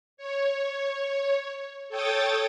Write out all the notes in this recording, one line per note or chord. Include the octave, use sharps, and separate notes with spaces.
C#5
A4 C#5 G5 D#6 A6